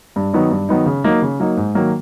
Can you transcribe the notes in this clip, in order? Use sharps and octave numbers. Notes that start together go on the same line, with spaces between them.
G2
D#3 F#3 B3 D#4
G2
D#3 F#3 B3 D#4
C#3
F#3 A#3 D#4
C#3
F#3 A#3 D#4
G#2
D#3 F#3 A#3